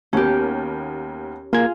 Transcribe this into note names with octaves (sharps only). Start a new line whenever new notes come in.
D#2 B3 C#4 G4 A#4
A#3 F4 G#4 G#6